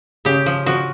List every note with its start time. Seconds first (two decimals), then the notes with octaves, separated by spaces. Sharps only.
0.25 C#3 G4
0.46 F3
0.66 F3 F#4